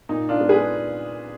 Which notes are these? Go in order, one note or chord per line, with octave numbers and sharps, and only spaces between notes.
A#2 D#4
D4 F4
G#3 B3
G#4 B4